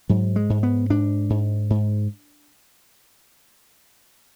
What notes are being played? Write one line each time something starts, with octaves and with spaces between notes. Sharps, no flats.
G#2 F#3
G#3
G#2
B3
G#2 D4
G#2
G#2